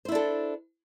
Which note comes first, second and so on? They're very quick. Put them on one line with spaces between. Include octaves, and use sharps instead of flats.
C5 E4 D4 A4